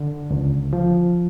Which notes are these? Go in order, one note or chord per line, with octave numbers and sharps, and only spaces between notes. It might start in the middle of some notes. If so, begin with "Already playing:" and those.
Already playing: D3
C#2
F3